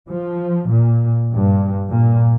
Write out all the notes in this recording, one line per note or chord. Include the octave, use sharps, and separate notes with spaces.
F3
A#2
G2
A#2